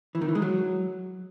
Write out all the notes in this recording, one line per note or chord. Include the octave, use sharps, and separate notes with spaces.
E3
D#3
E3
G#3
F#3